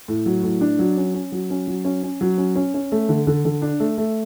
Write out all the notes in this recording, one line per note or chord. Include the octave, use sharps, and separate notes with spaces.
A2
F#3
A2
D4
F#3
C#4
C#4
F#3
C#4
F#3
C#4
C#4
F#3
C#4
C#4
C#4
A3
D3
D3
D3
D4
A3
A3